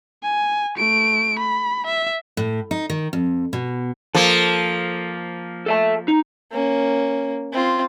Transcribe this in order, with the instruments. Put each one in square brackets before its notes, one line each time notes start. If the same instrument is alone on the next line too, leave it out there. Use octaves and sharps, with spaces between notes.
[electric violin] G#5
A3 D7
B5
E5
[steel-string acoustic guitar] A2
D#4
D#3
F2
B2
[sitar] F3 A#3 [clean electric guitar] A4
[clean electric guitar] A4 E5 A5
D#4
[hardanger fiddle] A#3 C#4
C4 F4